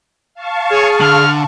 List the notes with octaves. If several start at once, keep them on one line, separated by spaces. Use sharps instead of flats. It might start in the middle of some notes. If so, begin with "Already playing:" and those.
F5 A5 C#6
G#4 C#5
D3 F6